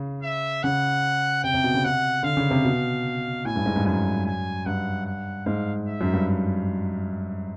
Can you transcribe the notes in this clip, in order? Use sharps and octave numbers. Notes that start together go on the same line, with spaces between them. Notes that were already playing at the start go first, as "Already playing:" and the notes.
Already playing: C#3
E5
C#3 F#5
C3 G5
C3
B2
C#3
C3 F#5
D3 F5
C#3
C3
B2
A2 G#5
G2
G#2
G2
F#2 G#5
G#5
G2 F#5
F#5
G#2 F5
E5
F#2
G2